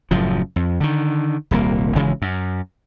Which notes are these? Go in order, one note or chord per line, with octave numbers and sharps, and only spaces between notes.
F#1 F#2 A2 F3
F2
D3 D#3
D#1 C2 A#3
G#1 C#3 E3 G#3
F#2